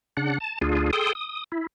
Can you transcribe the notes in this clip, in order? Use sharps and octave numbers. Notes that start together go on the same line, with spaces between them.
C#3 D4 F#5
A5
D2 D4 F4 G#4
G#4 A4 G5 C6 D#6
D#6
E4